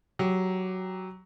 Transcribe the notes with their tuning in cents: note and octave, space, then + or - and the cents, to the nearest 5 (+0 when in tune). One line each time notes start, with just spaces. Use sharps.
F#3 +10 G4 +0